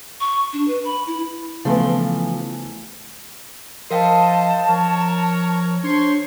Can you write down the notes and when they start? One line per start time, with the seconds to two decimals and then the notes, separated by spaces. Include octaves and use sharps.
0.21 C#6
0.53 D4
0.68 B4
0.85 B5
1.07 E4
1.65 C#3 E3 F3 A3 B3
3.90 F3 A#4 C5 D#5 F5 G5 A5
4.69 F3 A#4 C#5
5.01 A#5
5.83 D4 C5 C#5 C6